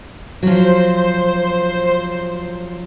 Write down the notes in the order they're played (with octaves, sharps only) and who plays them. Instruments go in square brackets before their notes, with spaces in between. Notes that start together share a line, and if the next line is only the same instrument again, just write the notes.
[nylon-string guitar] F3 F#3 [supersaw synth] C5